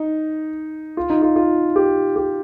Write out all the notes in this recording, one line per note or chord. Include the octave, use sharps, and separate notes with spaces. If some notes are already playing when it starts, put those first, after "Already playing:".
Already playing: D#4
F4
D#4
F4
F4
G4
G4